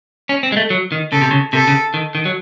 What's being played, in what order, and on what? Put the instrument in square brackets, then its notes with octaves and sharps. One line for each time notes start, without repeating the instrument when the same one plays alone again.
[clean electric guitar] C#4
C4
G#3
A3
F#3
D#3
[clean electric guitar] C#3 [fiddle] A4
[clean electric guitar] C3
C#3
[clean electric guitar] C3 [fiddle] A4
[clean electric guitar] C#3
D#3
D#3
F#3